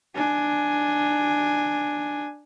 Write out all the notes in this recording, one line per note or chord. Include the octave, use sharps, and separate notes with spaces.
D4 G#5